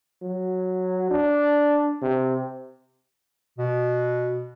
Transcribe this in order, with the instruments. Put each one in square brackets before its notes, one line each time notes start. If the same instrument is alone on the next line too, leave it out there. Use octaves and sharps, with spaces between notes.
[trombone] F#3
D4
C3
[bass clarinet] B2